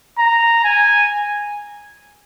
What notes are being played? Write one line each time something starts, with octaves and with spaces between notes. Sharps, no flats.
A#5
G#5